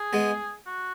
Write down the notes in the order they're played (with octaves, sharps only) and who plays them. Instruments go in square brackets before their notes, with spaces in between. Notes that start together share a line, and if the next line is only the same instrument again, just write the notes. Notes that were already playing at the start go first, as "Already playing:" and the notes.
Already playing: [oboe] G#4
[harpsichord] G#3 B3
[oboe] F#4